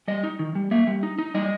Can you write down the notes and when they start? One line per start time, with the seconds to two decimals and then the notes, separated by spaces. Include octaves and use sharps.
0.08 G3 D#5
0.23 D#4
0.39 D#3
0.55 G3
0.71 A#3 E5
0.87 G3
1.03 D#4
1.18 D#4
1.34 G3 D#5